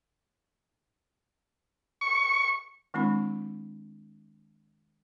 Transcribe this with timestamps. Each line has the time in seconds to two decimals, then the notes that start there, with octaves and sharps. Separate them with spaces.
2.01 C#6
2.94 D#3 G#3 C4 D4 E4 B5